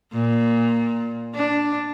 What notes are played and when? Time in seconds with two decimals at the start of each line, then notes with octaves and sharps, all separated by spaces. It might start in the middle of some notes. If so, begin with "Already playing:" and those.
0.13 A#2
1.35 D4